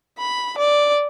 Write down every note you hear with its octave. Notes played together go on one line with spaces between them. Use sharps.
B5
D5